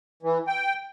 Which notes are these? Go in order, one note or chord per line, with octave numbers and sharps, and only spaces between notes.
E3
G5